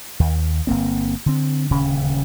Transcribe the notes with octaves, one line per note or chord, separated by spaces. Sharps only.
D#2
G1 A#3 C4
D3 C4
D#1 D2 C#3 C#4